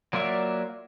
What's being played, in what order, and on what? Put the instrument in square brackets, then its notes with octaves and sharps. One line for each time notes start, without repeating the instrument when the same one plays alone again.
[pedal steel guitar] F#3 A#3 F4 D5 E5